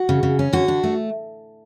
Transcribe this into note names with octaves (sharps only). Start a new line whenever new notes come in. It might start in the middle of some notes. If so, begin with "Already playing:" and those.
Already playing: F#4
C#3
C#3
C#4
D3 F#4
D4
A3